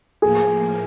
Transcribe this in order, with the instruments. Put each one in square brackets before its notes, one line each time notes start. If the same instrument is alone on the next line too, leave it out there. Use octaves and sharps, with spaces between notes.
[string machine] A2 F3 A#3 [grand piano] G#4